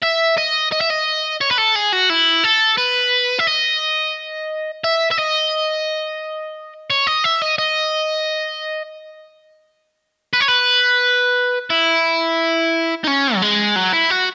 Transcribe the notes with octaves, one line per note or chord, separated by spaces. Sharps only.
E5
D#5
D#5
E5
D#5
C#5
B4
A4
G#4
F#4
E4
A4
B4
E5
D#5
E5
E5
D#5
C#5
D#5
E5
D#5
D#5
B4
C#5
B4
E4
D#4
C#4
F#3
G#3
F#3
E4
F#4